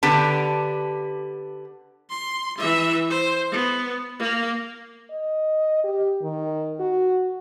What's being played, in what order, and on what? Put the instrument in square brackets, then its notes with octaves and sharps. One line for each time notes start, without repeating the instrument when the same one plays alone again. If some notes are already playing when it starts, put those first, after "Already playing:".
[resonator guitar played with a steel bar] D3 B3 G4 A5
[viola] C6
E3 E5
C5
B3
A#3
[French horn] D#5
G4
D#3
F#4